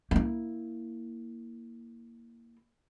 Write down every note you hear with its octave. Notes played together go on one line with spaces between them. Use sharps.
A#3 E4